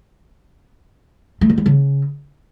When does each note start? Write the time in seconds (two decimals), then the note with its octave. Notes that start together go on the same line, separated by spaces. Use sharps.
1.41 A3
1.49 D#3
1.58 G#3
1.66 C#3